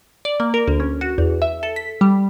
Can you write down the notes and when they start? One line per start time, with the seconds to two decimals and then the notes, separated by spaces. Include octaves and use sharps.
0.25 D5
0.40 A#3
0.54 A#4
0.67 D2
0.80 C#4
1.01 F#4
1.18 E2
1.42 E5
1.63 A4
1.76 B6
2.01 G3